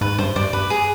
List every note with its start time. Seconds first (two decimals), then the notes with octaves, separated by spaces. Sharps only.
0.01 G#2 B4
0.18 G2 C5
0.36 G2 D5
0.53 G2 B4
0.70 G#4